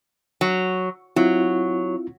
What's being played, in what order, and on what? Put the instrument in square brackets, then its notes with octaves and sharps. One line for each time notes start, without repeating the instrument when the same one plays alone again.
[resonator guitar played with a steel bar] F#3
[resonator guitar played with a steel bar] F#3 [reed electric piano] C4 E4 F4